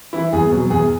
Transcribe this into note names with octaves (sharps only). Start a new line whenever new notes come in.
E3 E4
E2 G#4
B2 F#3
E2 G#4